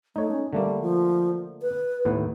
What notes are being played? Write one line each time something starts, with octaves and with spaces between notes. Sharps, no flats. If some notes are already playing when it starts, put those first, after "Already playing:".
A3 D#4 C#5
C#4
D3 G3 A3 A#3
F3
B4
D#2 A2 B3